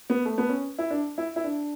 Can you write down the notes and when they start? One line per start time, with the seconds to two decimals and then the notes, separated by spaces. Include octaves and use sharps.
0.10 B3
0.25 A3
0.38 B3
0.49 C#4
0.79 E4
0.90 D4
1.18 E4
1.36 E4
1.44 D4